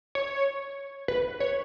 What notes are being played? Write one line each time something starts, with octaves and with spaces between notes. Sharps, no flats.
C#5
B4
C#5